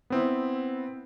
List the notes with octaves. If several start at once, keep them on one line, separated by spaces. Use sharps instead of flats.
B3 C4 E4